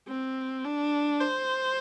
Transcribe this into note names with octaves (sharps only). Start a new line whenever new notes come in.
C4
D4
C5